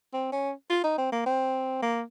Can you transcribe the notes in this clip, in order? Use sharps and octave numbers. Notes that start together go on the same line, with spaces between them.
C4
C#4
F4
D#4
C4
A#3
C4
A#3